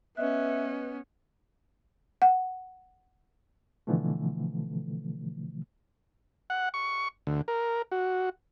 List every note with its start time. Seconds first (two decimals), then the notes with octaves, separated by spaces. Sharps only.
0.17 B3 C#4 B4 D#5 E5 F#6
2.22 F#5
3.87 B2 D3 E3 F3 A3
6.50 F#5
6.74 C#6
7.27 D2
7.48 A#4
7.92 F#4